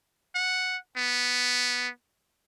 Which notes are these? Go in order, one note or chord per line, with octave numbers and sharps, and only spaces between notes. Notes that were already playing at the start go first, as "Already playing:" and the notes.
F#5
B3